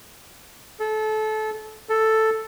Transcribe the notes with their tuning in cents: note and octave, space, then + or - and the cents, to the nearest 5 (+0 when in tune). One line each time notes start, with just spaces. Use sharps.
A4 -25
A4 +5